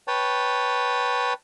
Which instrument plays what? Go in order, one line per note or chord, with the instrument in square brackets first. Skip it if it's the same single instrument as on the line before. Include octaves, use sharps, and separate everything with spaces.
[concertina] B4 C#5 G5 A5